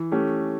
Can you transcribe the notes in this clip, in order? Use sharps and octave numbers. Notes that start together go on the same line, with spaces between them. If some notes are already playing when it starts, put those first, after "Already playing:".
Already playing: E3
A3 C#4 G4